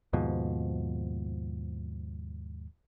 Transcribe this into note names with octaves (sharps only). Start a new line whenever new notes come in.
D#2 G#2 B2 F3